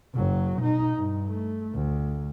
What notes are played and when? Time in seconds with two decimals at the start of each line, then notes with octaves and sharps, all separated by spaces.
0.15 F#1 F#3
0.58 B2 D#4
0.97 G2
1.28 A3
1.74 D2